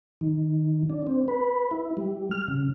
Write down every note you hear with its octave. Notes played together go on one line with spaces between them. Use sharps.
D#3
D4
C4
B4
E4
G3
F6
C#3